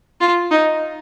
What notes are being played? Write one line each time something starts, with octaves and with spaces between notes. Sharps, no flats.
F4
D#4